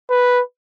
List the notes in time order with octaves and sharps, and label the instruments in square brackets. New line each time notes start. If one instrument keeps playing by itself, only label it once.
[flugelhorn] B4